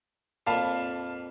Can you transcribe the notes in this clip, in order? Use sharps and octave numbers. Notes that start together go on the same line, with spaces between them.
F2 A#2 F5 A5 B5